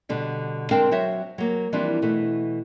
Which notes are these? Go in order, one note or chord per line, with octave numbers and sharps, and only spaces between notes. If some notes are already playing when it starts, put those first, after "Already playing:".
B2 D3 G3
G#3 C4 D4 A#4 F5 G5
F#3 F#4 C5 C#5 E5
F#3 A#3
E3 F3 G3 A#3 C4 D4
B2 E3 A3 B3